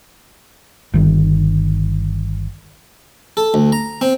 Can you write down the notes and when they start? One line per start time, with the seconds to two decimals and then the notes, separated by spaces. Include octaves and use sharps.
0.94 G1 D#3
3.37 A4
3.54 D2
3.72 A#5
4.01 C4